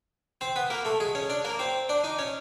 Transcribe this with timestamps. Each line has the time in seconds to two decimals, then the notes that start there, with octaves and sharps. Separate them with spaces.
0.41 C4 C5
0.56 B3 B4
0.70 A#3 A#4
0.85 A3 A4
1.00 G#3 G#4
1.15 C#4 C#5
1.30 D4 D5
1.44 A#3 A#4
1.59 C4 C5
1.89 D4 D5
2.04 D#4 D#5
2.19 C#4 C#5